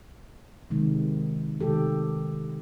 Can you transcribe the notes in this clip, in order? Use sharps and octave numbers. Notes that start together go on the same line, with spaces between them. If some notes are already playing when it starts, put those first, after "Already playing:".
C3 D#3 G#3
C3 D#3 G#3 G4 A4